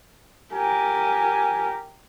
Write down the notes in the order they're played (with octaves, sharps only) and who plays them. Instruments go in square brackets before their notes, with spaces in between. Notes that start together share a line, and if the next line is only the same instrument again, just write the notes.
[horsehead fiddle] G4 A#4 [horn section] G#5